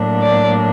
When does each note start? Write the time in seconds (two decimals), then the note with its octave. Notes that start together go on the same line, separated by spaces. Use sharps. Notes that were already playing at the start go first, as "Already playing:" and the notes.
Already playing: A2 F#3 A#3 D4
0.20 D5